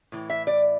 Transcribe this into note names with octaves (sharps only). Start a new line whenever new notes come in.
A2 E3
E5
D5